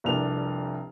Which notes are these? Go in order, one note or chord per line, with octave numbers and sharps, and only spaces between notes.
F1 C2 D4 A#4 F7